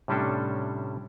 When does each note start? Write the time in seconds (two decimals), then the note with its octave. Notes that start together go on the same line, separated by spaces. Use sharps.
0.08 A2 C3 G3 C#4 D4 A4